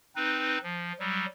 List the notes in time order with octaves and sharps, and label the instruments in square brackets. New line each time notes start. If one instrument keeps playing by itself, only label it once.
[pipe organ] C4 D#4 B4
F3
F#3 G3